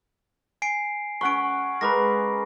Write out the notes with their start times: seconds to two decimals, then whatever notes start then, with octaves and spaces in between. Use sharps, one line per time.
0.62 G#5 C7 D7
1.21 C#4 F#5 B5 C#6 D7
1.81 G#3 A#4 B4 B5 D6 A#6